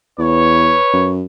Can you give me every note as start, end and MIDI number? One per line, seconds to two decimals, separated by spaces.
0.18 0.76 40
0.18 1.10 71
0.18 1.10 73
0.93 1.23 42